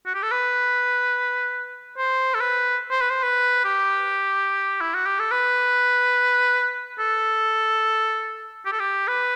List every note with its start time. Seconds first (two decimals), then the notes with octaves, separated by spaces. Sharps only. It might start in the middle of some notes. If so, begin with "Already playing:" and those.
0.06 F#4
0.15 G4
0.23 A4
0.31 B4
1.98 C5
2.34 A4
2.41 B4
2.91 C5
3.01 B4
3.10 C5
3.23 B4
3.65 G4
4.81 E4
4.94 F#4
5.06 G4
5.19 A4
5.32 B4
6.99 A4
8.66 G4
8.72 A4
8.80 G4
9.07 B4